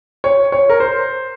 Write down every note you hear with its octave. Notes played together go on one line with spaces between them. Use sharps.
C#5
C#5
A#4
C5